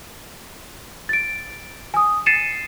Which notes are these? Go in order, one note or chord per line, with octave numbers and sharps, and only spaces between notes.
A6 D7
G#5 D#6
A6 C7 C#7 D#7 E7